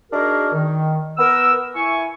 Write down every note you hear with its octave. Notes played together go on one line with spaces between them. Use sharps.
D4 D#4 F#4 G#4 A#4
D#3
B3 A#4 E6
E4 G#5 C#6